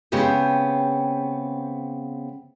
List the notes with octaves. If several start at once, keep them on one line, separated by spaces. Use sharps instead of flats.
C#3 G#3 B3 C4 G4 G5